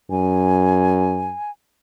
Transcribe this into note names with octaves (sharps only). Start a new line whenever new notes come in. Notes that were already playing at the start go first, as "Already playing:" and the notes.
F#2 G#5